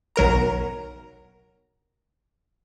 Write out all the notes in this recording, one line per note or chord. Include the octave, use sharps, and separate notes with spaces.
B1 F#3 A#4 A#5